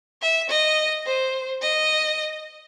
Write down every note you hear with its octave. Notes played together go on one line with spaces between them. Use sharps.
E5
D#5
C5
D#5